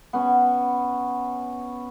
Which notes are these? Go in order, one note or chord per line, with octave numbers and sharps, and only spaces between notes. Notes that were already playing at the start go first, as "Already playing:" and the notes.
B3 C#4